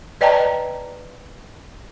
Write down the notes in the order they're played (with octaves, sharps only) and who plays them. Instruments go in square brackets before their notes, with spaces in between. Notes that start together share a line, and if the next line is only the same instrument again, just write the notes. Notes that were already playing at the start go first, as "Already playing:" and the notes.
[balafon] B4 D5 D#5 G5 A5 A#5